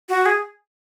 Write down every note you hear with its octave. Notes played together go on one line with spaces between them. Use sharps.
F#4
G#4